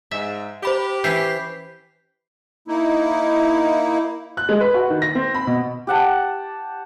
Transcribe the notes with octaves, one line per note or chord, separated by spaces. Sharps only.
G#2 E5
G4 C5 B5 D6
E3 C#4 G6 B6 C7
A#3 D#4 E4
F#6
G#3
B4
F#4
D#3
A#6
C4
B5
B2
G4 F#5 A5